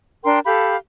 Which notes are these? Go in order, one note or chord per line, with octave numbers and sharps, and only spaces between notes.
D4 A#4 G5 C6
G4 A4 F5 B5